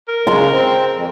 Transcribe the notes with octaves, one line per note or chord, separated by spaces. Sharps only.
A#4
C#3 G#3 A#5 C6
C4
F2